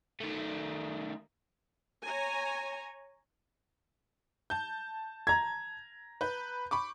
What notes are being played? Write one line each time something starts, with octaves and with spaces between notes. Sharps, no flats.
D#3 A3
C#5 G#5 A#5
A5 G6
A#5 G#6
B4 G6
B5 C#6 D6